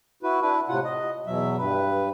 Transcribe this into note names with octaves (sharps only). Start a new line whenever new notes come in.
E4 F#4 B4
D4 E4 B4
A2 C3 F4 F#5
D#5
E2 B2 F#3 E5
G2 B4